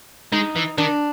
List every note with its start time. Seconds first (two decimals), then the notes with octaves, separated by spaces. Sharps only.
0.32 G#3 D#4
0.56 E3
0.78 D#3 D4